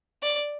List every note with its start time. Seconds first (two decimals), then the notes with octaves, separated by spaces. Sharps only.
0.23 D5